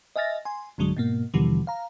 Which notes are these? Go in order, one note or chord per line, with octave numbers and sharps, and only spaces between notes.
D#5 E5 G#5 F6 A6 A#6
G#5 C6
B1 G2 D3 F#3 G#3
G#2 B2 A#3
D#2 B2 D3 E3 F3 G3
F5 A#5